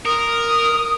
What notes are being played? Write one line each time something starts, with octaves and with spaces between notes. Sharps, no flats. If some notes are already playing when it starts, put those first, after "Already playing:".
A#4 D#6